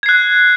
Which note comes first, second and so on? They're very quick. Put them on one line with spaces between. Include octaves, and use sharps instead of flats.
G#6 C7 F#6